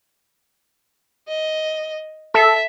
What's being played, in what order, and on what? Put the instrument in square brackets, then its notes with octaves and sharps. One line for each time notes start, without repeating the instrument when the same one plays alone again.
[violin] D#5
[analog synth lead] A4 [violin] E5